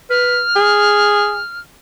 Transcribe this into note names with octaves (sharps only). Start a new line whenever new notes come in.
B4 F6
G#4